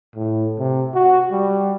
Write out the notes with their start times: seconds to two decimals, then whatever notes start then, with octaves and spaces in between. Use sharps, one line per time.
0.16 A2
0.59 C3
0.94 F#4
1.32 G3